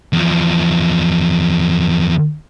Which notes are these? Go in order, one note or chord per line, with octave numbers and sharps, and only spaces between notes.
E2 F3